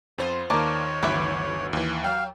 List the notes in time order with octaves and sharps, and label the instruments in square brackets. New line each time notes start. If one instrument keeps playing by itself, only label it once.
[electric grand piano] F2 [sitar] B3 F4 C5
[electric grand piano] D#2 D#3 [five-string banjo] A#3 D5 A5 [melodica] C#5
[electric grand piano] G1 D2 D6 [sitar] D#3 F#3 [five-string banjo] B4 E5
[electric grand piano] D#2 E3
[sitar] F#3 [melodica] F5 [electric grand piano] G5